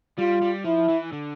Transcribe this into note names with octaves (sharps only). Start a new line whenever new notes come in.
G3 F4
G3
F3 E4
E3
D3